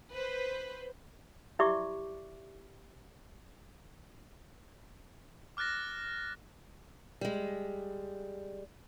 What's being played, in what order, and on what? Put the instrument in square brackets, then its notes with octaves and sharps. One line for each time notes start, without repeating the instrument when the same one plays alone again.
[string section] B4 C5
[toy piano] E4 G4 D5 E5 C#6 D6
[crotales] D6 F6 F#6 A6 A#6
[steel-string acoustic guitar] G3 G#3